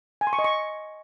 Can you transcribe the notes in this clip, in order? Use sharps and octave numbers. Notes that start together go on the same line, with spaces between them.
G#5
C6
C#6
D#5
C#6